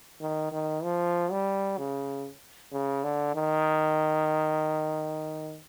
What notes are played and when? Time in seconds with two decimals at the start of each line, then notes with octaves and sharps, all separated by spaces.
0.21 D#3
0.52 D#3
0.83 F3
1.31 G3
1.78 C#3
2.72 C#3
3.04 D3
3.35 D#3